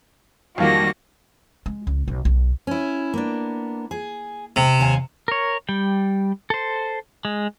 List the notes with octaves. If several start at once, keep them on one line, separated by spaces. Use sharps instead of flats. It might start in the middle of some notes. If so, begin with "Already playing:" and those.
F2 D#3 G3 A#3 F4 F#4 A#6
G#3
C#2
B1
B1
C#4 E4
A#3 B3 D4
G#4
C3
D#2 F5 G#5
A#4 C#5
G3 G5
A4 C5
G#3